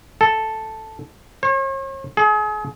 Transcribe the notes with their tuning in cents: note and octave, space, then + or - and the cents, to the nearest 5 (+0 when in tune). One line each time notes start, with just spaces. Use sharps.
A4 +0
C#5 -45
G#4 +35